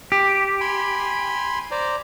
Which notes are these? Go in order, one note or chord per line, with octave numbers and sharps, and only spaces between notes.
G4
G#5 B5 C6
C5 D5 A#5